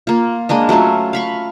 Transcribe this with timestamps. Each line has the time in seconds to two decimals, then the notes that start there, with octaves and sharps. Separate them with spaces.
0.07 A#3 F4
0.49 G#3 A#3 D4 D#5
0.69 F#3 A3 C#4 F4
1.13 F5 B5 C#6